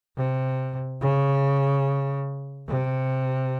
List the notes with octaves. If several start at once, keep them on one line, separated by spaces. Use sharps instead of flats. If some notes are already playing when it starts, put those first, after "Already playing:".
C3
C#3
C3